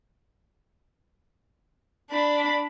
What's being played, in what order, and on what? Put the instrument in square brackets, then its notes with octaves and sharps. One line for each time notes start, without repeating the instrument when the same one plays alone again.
[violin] D4 B5